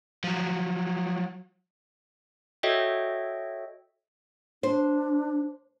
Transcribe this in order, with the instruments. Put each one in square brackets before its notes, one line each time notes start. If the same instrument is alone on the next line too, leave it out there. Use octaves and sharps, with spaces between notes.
[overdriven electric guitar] F3 F#3
[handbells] F#4 A4 C#5 D#5 E5 G5
[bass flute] D4 [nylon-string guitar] C5